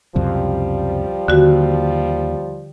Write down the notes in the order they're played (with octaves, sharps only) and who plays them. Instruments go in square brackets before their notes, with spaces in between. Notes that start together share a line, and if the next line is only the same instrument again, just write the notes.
[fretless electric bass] C#2 F#2 C3 [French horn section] F3 G3
[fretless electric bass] D#2 [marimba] D3 F#4